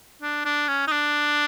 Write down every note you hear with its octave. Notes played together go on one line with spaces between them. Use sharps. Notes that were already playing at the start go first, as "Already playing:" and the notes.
D4
D4
C#4
D#4
D4